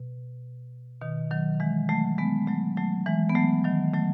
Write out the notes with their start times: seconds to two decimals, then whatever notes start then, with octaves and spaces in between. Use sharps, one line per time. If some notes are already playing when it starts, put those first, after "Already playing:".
Already playing: B2
1.01 B2 D#3
1.31 D#3 F#3
1.60 E3 G#3
1.89 F#3 A3
2.18 G#3 B3
2.47 F#3 A3
2.77 F#3 A3
3.06 E3 G#3
3.29 B3
3.35 F#3 A3
3.65 D#3 F#3
3.94 F#3 A3